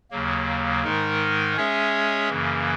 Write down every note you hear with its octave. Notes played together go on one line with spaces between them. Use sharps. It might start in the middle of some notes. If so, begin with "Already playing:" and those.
D#2 C#3 F#3 A#3
G#2 D#3 G#3 D#4 A#4
G#3 C#4 G#4 C#5 E5
F#2 C#3 E3 A#3